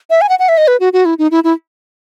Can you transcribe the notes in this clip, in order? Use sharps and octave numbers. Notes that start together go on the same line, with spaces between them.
E5
G#5
F#5
F#5
E5
D#5
B4
F#4
F#4
E4
D#4
E4
E4